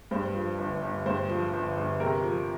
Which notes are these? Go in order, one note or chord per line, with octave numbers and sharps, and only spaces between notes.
G2 C5
F3
G1
G1
G2 C5
F3
G1
G1
C3 A#4
F3